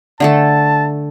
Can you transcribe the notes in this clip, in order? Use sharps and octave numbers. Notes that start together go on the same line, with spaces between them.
D3 A3 A4 A5